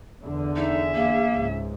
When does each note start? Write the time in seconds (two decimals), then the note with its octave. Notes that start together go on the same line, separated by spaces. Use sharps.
0.24 E2 D3
0.56 D#4 G#4 E5
0.95 A#3
1.34 C#2 G#2